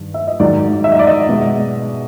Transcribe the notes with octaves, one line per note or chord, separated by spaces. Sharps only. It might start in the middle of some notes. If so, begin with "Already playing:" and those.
Already playing: G2 D#3
E5
D#5
G#2 D#3 F#3 D5
E5
D#5
D5
D#5
B2 G#3